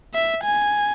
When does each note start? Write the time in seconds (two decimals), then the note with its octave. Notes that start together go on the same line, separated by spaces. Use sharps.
0.14 E5
0.44 G#5